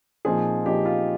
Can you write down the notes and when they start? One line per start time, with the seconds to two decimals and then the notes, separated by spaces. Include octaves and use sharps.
0.25 A#2 F3 C4 D#4 G#4
0.66 A#2 F3 C4 D#4 G4
0.85 F4